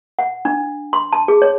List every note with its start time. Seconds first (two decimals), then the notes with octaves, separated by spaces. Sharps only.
0.19 F#5
0.45 D4
0.93 C6
1.13 A5
1.28 G#4
1.42 C#5